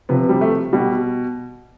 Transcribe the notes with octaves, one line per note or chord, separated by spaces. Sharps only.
C3 F3 B3
G3
A3
B2 G3